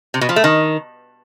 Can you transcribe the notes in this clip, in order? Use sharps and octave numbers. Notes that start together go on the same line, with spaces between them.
C3
B2
F3
A3
D#3